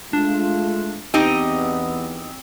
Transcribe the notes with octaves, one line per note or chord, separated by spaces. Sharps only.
G#3 A3 D4 F4
E2 B3 C4 D#4 G4 D#5